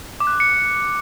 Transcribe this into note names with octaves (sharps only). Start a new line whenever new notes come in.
D6
F#6
D6
C#7